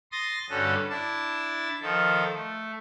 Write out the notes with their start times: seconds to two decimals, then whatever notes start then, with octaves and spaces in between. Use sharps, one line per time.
0.12 C6 D#6 A6 A#6
0.50 G2 D3 G3 C#4 F#4 A4
0.90 D4 E4 A5
1.81 D#3 F3 A4
2.34 A3